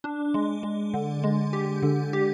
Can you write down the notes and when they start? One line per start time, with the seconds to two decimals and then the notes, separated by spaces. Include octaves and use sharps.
0.04 D4
0.34 G#3
0.63 G#3
0.94 D3
1.24 G#3
1.53 G4
1.82 D3
2.13 G4